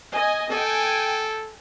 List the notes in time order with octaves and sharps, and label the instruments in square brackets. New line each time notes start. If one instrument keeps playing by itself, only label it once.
[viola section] D#5 G#5
[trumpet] A4 [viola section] G5 G#5